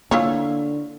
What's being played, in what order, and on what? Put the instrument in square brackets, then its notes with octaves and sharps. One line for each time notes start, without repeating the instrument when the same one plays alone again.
[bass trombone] D3 [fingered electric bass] A#3 [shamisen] E4 F4 C#5